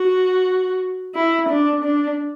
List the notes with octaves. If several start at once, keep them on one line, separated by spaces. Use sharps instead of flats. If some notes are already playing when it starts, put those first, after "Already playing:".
Already playing: F#4
E4
D4
D4